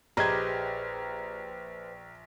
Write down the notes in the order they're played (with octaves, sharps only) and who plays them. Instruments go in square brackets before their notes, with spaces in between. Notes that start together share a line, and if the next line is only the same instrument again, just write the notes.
[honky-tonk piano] A#1 [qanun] G4 G#4 D#5 [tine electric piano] B4 C5 [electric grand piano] A#5 G#6